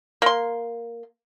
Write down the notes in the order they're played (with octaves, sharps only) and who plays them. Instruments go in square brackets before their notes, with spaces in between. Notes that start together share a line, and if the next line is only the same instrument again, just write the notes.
[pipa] A#3 C6